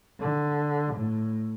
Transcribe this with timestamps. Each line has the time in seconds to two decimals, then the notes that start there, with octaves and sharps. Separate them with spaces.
0.20 D3
0.94 A2